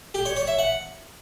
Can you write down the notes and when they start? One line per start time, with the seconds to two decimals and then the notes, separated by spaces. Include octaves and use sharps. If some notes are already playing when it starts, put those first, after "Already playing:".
0.14 G4
0.25 C#5
0.36 C#5
0.47 E5
0.59 F#5